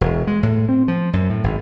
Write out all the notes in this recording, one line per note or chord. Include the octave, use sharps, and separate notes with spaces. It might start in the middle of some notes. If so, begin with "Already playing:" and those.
E1
G#3
A2
C4
F3
F#2
A2
G#1